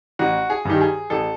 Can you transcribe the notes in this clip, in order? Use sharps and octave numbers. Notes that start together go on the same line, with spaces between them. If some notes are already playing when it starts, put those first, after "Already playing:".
A1 F#4
G#4
G2 D#3 G4
G#4
A1 A4